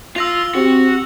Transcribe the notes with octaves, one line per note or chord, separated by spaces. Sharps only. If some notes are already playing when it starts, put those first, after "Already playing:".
F4 E6 A#6 F7
C4 F#4 G4